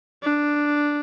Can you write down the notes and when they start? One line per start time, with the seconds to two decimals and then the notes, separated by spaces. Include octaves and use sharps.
0.23 D4